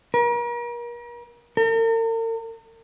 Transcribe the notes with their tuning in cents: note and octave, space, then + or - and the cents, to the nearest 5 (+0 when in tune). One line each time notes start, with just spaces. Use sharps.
A#4 +40
A#4 -45